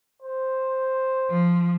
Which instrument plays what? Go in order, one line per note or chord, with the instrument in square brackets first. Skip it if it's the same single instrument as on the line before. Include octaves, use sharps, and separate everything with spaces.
[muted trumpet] C5
[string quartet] F3